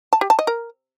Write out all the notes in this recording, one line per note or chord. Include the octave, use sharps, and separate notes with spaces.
A5
G4
A5
D#5
A#4